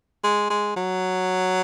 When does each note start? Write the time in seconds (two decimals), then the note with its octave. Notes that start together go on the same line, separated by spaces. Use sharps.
0.24 G#3
0.50 G#3
0.76 F#3